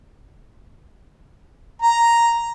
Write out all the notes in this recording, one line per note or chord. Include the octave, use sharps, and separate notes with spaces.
A#5